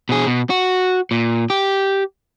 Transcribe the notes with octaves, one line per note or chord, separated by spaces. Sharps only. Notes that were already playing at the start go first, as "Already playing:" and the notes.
B2 G#4
B2
F#4
A#2
G4